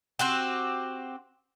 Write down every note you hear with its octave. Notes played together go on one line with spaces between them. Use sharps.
C4 F#4 G4